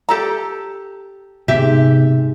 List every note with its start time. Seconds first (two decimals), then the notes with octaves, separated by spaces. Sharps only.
0.09 G4 A4 A#5
1.48 G#2 C3 B3 G4 E5